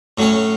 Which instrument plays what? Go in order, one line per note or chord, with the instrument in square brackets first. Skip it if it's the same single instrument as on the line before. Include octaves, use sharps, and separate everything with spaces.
[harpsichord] A2 F#3 C#4